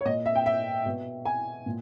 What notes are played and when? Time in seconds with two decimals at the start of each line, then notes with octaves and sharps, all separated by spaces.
0.01 C#5
0.05 A#2 D#5
0.26 E5
0.35 G5
0.46 E5
0.86 B2
1.25 G#5
1.66 A#2